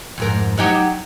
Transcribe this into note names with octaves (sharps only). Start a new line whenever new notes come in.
F2 G#2 A#4
F#3 D#4 G4